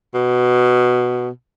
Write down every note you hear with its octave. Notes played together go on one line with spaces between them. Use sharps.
B2